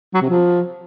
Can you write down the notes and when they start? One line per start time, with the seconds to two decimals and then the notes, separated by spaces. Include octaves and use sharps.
0.14 F#3
0.22 C3
0.29 F3